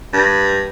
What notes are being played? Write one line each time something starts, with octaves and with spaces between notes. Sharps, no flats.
G2